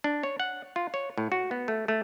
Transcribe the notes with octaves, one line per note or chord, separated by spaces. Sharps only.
D4
C#5
F#5
F4
C#5
A2
F#4
B3
A3
A3